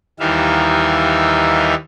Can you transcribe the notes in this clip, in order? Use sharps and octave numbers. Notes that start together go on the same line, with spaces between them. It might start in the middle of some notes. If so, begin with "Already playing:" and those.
D#2 E3 G3 D#4 E5 F5